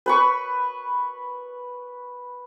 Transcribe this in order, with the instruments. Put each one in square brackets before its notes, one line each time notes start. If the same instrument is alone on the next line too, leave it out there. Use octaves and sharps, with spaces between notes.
[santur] B4 B5 C#6